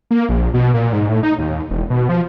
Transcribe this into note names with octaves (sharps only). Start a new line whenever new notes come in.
A#3
A#1
B2
A#2
G#2
A2
D#4
D#2
E1
B2
F3